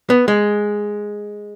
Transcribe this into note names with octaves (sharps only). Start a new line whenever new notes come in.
B3
G#3